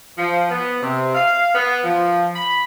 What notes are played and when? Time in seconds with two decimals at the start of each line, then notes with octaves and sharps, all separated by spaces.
0.18 F3
0.50 B3
0.81 C3
1.15 F5
1.55 B3
1.84 F3
2.35 B5